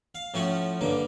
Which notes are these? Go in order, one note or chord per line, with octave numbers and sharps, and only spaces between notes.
F5
A2 F3 A3 C#4 F#4
G2 D3 A#3